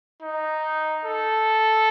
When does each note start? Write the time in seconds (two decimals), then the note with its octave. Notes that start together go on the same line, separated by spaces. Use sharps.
0.22 D#4
1.05 A4